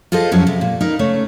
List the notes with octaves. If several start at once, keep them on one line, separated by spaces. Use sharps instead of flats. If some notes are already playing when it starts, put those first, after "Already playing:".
F4 G#4 A4 C5 D#5
F2 F#3 C#4 E4
C3
A#2
D#4 A#4 B4
C#3 A3 C#5